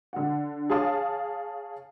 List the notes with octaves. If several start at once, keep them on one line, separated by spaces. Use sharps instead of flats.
D3 F#5
G#4 C#5 F5 A5 D#6